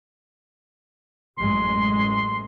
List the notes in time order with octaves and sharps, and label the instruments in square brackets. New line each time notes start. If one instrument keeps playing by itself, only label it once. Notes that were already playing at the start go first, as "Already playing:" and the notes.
[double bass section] A1 F#2 G#3 [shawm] C6